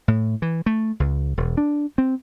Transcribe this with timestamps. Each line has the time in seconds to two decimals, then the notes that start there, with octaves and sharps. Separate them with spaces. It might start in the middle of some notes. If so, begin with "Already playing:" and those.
0.08 A2
0.42 E3
0.66 A3
1.00 C#2
1.37 E1
1.57 D4
1.98 C4